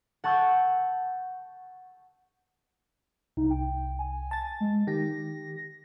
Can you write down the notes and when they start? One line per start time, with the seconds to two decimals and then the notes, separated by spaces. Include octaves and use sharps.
0.24 F#5 A5 C#6 E6 G6
3.37 C2 D#4
3.50 G5
3.99 G#5
4.31 A5 A6
4.60 G#3
4.87 D#3 G4 A#6